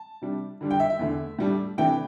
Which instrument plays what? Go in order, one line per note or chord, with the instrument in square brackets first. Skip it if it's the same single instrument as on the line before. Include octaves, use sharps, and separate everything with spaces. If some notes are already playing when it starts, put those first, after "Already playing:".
Already playing: [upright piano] A5
C3 G3 D4
D3 G3 D4
G5
E5
E5
E2 D3 A3
A2 G3 D4
C3 E3 A3 D4 G5